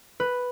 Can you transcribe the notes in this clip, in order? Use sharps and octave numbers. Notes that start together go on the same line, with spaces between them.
B4